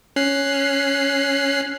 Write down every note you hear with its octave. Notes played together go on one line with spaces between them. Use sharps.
C#4 F#6 C7